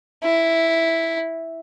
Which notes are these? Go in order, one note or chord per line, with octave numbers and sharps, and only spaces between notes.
E4